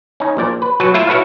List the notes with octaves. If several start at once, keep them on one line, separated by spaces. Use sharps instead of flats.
C#4 D#4
A#1 A#2 D5
B4
F#3 F#4 B4 A5
A3 E4 F4 E5
E4 F#4 A4 B4 C#5 F5